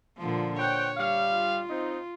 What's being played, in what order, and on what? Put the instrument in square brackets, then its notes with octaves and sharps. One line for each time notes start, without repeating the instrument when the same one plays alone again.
[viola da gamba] A#2 D3 F3
[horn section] C5 F#5 G5 [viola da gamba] C#5
[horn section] G3 F5
[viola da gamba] F4
[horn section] C4 D#4